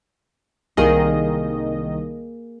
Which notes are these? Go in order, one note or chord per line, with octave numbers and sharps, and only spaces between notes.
C2 D#3 A#3 G#4 D#5